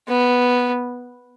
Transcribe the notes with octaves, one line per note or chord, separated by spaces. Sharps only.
B3